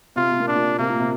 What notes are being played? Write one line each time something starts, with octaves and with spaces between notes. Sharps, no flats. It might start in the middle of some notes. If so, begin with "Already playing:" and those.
C3 F4
C3
A#2
D4
A#2
C3 A#3
A#2
C3